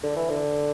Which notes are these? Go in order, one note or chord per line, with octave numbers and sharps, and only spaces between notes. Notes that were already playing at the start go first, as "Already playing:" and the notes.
D3
E3
D3